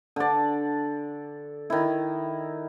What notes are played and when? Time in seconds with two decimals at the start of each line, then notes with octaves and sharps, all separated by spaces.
0.16 D3 D5
1.70 D#3 E4